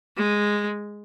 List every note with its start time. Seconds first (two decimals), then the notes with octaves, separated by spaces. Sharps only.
0.17 G#3